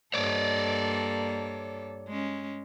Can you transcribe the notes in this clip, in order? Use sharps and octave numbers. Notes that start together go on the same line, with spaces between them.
G2 A#3 A4 C#5 D5
G#3 C#4